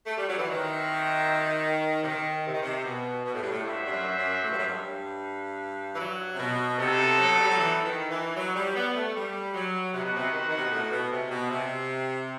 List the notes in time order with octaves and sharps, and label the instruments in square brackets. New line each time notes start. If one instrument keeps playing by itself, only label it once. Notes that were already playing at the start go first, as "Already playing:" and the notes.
[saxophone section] A3
G3
F#3
E3
[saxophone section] D#3 [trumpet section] C4 F#4 C5 E5
[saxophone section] C3
D#3
C3
D#3
C3
B2
B2
A2
G2
A2
[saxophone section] G2 [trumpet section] F#4 C5 E5
[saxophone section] G2
F#2
F#2
A2
G2
F#2
G2
E3
F#3
C3
B2
[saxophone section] C3 [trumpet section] B3 D#4 A4
[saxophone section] F#3
G3
F#3
E3
D#3
E3
F#3
G3
B3
A3
G3
F#3
[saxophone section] C3 [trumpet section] D#4 F#4 B4 F#5
[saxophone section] B2
C3
D#3
D#3
C3
B2
A2
B2
C3
B2
C3